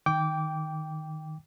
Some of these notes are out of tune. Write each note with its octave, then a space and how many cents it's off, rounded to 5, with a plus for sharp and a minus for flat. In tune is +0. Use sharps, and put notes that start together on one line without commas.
D#3 -5 G5 +0 D6 -20